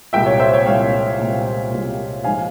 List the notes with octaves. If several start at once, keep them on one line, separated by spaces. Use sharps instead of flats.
C2 A#2 G#3 E5 G5
C#5
C5 E5
C#5
C2 A#2 G#3 C#5 F5
C2 A#2 G#3
C2 A#2 G#3
G#2 F3 G#3 F5 G#5